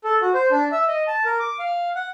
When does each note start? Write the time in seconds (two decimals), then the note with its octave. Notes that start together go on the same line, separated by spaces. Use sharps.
0.04 A4
0.22 F#4
0.34 C5
0.51 D4
0.72 E5
0.88 D#5
1.08 A5
1.25 A#4
1.40 D6
1.59 F5
1.96 F#5